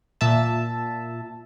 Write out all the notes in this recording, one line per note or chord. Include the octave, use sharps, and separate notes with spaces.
A#2 E5 A5